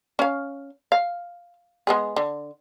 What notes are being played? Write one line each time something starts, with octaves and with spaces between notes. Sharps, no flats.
C#4 F5
F5
G#3 B3 G#4
D3